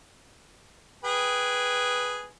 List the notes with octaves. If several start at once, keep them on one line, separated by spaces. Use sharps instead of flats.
G#4 B4 G5